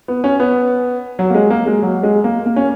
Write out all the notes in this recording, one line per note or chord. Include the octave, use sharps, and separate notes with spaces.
B3
C#4
B3
F#3
A#3
G#3
A#3
G#3
F#3
G#3
A#3
A#3
C#4